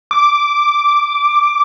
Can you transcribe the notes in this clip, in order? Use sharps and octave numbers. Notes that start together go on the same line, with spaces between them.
D6